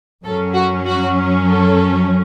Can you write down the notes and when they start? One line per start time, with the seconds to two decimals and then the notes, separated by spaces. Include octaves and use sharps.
0.24 F#2 F#3 C#4 A4
0.54 F#4
0.85 F#4
1.46 A4